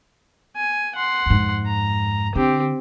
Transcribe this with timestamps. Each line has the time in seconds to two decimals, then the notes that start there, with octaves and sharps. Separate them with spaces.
0.56 G#5
0.96 F#5 C6
1.26 F2 G#2
1.67 A#5
2.35 D3 C4 G4